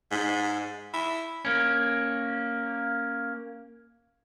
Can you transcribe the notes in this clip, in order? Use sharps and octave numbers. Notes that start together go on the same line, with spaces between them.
G#2
E4
A#3 C#4